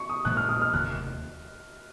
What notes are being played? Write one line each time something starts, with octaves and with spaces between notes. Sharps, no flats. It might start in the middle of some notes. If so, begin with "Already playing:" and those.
Already playing: C#6
D#6
A#1 A#2 F3 G#3 F#6
F6
D#6
F6
F1 D#2 D#3 F#6